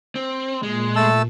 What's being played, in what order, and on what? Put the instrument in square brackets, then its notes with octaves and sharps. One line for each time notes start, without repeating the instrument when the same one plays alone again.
[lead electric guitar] C4
[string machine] A#2 [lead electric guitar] G#3
[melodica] A3 A5 E6